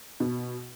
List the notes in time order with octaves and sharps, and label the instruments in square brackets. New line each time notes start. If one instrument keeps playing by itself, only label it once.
[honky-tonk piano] B2